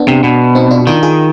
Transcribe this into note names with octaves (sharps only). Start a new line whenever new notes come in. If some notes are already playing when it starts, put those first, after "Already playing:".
Already playing: B3 D4
C3
B2
C4 D#4
D4 F4
D#3 D4 F4
F4 G#4